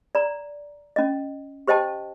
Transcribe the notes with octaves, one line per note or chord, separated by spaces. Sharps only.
D5 A#5
C#4 D#5
G4 C5 D#5 G5 A5